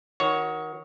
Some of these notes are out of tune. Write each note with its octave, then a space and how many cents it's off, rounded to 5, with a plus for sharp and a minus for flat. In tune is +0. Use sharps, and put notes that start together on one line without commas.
D#3 +20 F#4 +0 C#5 +0